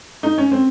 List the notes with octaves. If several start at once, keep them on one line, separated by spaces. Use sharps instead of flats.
D#4
C#4
C4